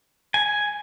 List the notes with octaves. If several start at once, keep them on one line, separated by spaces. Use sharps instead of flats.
G#5